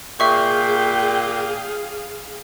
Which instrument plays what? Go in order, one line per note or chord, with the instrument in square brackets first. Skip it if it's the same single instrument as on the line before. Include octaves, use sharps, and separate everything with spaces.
[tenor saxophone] A#2 [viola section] G#4 F5 [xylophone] E5 C#6 [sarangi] G5